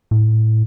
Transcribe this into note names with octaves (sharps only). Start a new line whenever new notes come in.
A2